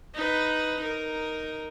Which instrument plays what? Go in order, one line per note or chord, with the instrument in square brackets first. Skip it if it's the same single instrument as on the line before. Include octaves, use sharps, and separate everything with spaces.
[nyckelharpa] D#4 B4
D#4 A#4